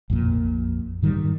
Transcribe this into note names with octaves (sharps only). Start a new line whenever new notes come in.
A#1 F2 A#2
G#2 D#3 E3 G3